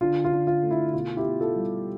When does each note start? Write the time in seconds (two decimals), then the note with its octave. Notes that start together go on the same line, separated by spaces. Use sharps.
0.01 D3 F4
0.25 F4
0.32 D3
0.47 F4
0.63 A3
0.71 E4
0.93 B2 F4
1.17 E4 G4
1.25 B2
1.40 F4 A4
1.56 G3